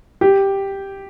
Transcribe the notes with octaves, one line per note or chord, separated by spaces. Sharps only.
G4